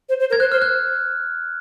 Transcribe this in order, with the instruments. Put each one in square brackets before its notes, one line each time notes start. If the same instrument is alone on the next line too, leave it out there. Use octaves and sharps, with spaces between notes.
[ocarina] C5
C5
A#4
[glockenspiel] G#6
[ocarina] C5 [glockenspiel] F#6
[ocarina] C5 [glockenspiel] F6
[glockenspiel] F#6